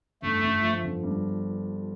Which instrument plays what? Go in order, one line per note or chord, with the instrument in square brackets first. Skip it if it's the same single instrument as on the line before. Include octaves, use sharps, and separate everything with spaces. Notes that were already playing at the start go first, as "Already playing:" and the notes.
[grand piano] G1 [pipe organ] A3
[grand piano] G1
F3
G1
G2